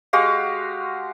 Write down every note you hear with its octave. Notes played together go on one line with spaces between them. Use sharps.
G#3 F#4 G4 F5